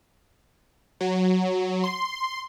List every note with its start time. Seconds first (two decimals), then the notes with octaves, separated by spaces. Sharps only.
1.01 F#3
1.84 C6